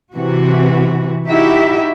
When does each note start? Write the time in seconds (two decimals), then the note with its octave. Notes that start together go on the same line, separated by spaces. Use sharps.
0.15 C3 E3 F#4
1.28 D#4 E4 F#4 G4 E5